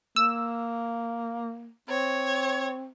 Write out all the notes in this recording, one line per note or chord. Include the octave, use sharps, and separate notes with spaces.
A#3 E6
C4 C#5